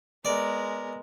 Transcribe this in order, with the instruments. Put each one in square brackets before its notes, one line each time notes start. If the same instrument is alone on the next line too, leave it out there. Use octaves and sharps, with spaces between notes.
[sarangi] G#3 [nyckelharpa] B3 A#4 [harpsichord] D5